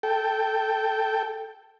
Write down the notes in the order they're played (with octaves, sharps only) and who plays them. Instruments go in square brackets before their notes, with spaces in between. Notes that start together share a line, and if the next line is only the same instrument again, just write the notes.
[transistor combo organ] A4 G5